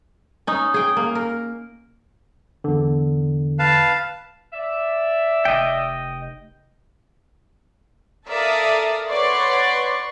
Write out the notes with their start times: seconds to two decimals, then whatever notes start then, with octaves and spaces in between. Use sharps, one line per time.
0.47 C#4 D#4
0.74 G#4 G5
0.97 A#3
1.15 A#4
2.64 E2 D3
3.59 B4 F5 A5
4.53 D5 E5
5.45 F1 D#5 G5
8.27 A4 A#4 D5 E5 F5 D#6
9.10 B4 C#5 D5 F#5 C6 C#6